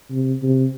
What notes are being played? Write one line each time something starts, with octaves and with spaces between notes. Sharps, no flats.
C3
C3